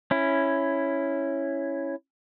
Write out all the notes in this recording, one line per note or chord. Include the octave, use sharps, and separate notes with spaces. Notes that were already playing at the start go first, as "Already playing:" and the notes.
C#4 E4